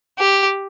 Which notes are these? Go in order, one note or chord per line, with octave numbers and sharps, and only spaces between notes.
G4